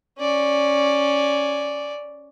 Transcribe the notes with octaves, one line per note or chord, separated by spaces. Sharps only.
C#4 D5